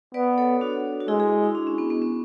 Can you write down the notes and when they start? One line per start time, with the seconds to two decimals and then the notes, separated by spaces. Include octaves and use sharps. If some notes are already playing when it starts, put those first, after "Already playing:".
0.14 B3 B4 D5
0.38 A4 C#5
0.61 D4 F#4
1.00 F#4
1.08 G#3 E4 G#4
1.20 E4 G#4
1.44 E4
1.55 D4
1.67 C#4
1.78 B3
1.90 B3
2.02 C#4